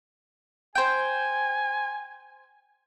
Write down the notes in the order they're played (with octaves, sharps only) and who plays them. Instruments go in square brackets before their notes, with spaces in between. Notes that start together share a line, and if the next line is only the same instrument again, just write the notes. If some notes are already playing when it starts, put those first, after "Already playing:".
[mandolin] C5 G5 [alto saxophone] G#5